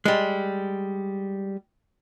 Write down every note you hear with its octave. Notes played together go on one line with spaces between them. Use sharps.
G3 G#3